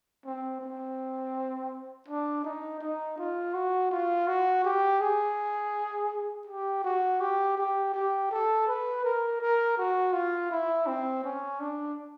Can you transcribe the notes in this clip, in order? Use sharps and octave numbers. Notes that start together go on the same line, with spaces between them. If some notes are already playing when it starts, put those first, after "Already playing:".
C4
C4
D4
D#4
D#4
F4
F#4
F4
F#4
G4
G#4
G4
F#4
G4
G4
G4
A4
B4
A#4
A#4
F#4
F4
E4
C4
C#4
D4